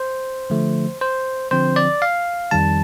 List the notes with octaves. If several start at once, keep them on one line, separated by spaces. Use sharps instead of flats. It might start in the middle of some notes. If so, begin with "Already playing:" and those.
Already playing: C5
D3 F3 A3
C5
D3 F3 C4 C5
D5
F5
F2 D#3 G3 A5